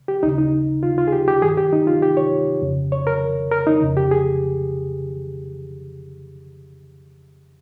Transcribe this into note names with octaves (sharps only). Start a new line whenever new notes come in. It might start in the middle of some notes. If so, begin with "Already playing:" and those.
G4
D#2 C#3 D#4
D#4
F4
F4
G#4
G4
G4
G2 D#3 G#4
G4
D#4
F4
G4
C#5
F2 C#3
C#5
A#4
A#4
D#4
F2 C#3
G4
G#4